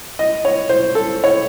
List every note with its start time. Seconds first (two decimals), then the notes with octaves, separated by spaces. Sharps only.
0.19 D#5
0.45 C#5
0.69 C5
0.95 A4
1.24 C#5